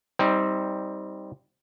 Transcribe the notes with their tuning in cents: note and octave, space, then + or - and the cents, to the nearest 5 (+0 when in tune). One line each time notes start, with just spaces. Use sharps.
G3 +0 C4 +0 D#4 +25